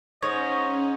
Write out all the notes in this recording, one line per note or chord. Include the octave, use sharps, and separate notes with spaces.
G#2 C#4 C#5 D#5